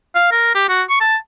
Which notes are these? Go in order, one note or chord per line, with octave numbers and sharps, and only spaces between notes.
F5
A#4
G4
F#4
C#6
A5